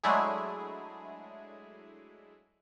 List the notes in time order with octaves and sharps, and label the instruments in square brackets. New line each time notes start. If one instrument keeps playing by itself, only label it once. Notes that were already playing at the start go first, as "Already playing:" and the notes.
[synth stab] F#3 G#3 A3 D4 E4 G#4